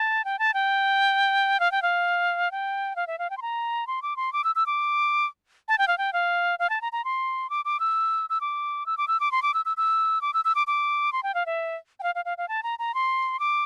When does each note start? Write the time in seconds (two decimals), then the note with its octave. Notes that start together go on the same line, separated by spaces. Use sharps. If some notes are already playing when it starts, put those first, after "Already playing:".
Already playing: A5
0.25 G5
0.39 A5
0.54 G5
1.60 F5
1.72 G5
1.82 F5
2.51 G5
2.96 F5
3.07 E5
3.19 F5
3.30 G5
3.37 C6
3.42 A#5
3.87 C6
4.02 D6
4.17 C6
4.33 D6
4.44 E6
4.55 E6
4.66 D6
5.68 A5
5.78 G5
5.88 F5
5.98 G5
6.13 F5
6.59 F5
6.70 A5
6.82 A#5
6.92 A#5
7.05 C6
7.50 D6
7.65 D6
7.80 E6
8.30 E6
8.41 D6
8.86 E6
8.97 D6
9.08 E6
9.20 D6
9.32 C6
9.43 D6
9.54 E6
9.65 E6
9.77 E6
10.22 D6
10.34 E6
10.45 E6
10.55 D6
10.67 D6
11.13 C6
11.23 G5
11.35 F5
11.46 E5
12.00 G5
12.03 F5
12.15 F5
12.25 F5
12.38 F5
12.49 A5
12.63 A#5
12.79 A#5
12.94 C6
13.40 D6